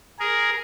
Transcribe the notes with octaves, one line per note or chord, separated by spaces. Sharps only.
G#4 A#4